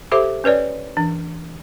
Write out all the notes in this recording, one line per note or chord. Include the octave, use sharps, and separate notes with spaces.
G4 A4 C5 E5 D6
C#4 B4 C#5 D5
E3 D4